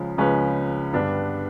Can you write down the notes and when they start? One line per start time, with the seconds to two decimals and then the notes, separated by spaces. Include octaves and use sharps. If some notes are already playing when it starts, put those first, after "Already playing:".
Already playing: C#2 C#3 F3 G#3 C#4
0.17 C#2 C#3 F3 G#3 C#4 B4
0.93 G2 D3 G3 B3 D4